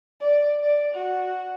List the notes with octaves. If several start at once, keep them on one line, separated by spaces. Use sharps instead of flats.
D5
D5
F#4